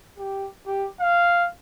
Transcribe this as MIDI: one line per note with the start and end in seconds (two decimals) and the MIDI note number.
0.18 0.48 67
0.67 0.88 67
1.00 1.48 77